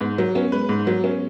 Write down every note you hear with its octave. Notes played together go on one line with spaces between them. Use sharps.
G#2 B3
F#3
B3 C#4
G#3 B4
G#2
F#3
C#4